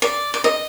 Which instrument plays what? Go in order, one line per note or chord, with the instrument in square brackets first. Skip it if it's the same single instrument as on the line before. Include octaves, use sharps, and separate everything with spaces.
[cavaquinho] D5
D5
D#5